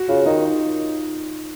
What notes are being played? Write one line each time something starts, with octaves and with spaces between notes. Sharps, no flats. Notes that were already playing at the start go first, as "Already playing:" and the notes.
Already playing: F#4
C#3 F4
D#3 D#4